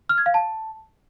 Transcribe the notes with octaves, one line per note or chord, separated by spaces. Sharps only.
F6
G#6
F5
A5